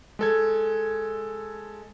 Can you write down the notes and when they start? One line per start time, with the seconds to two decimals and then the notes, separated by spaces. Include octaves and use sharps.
0.19 G#3 A4 G#6